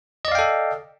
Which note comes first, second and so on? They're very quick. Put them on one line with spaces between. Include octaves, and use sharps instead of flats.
D#5 D5 F5 G5 A4